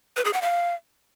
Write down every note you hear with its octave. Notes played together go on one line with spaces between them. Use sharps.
B4
G#4
F#5
F5